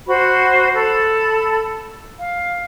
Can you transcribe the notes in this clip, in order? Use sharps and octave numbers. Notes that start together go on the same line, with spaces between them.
F#4 C5 B5
A4 B5
F5